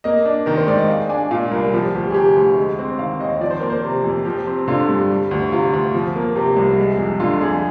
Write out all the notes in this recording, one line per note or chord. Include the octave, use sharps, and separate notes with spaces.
A#3 D#5
D4
D#3 A#4
C5
G#2 D5
D#5
G#3 F5
D4 G#5
A#2 F5
C2 A#4
F3 G4
D2 G4
G#4
C3 G4
D2
G#3
C4
D#3 F5
D#2 D#5
F3 D5
C5
A#3 A#4
C5
C3
F2
F3 G4
C4
D3 F4
G2
G3
D2
C3 F4
D2
F3
A#3
C3 G4
C2
G#3
F2
D3 F4
F2 G#4